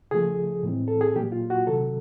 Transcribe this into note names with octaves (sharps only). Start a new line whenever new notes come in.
C#3 F3 A3 G#4
A2 E3 G#3 C4
A4
G#4
A#2 F#3 A#3 G4
F4
F#4
C3 D#3 F#3 A4